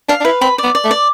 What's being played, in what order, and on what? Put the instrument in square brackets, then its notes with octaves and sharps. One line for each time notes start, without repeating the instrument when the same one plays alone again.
[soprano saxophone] D4 [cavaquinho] F5
[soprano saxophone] D4
[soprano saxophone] E4 [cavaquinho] B4
[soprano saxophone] C4 [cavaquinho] B5
[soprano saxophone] B3 [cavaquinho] D5
[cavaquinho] D5
[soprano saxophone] A3
[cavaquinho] D5